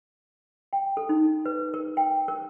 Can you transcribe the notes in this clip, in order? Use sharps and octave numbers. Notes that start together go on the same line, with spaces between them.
G5
A4
D#4
B4
A#4
G5
A#4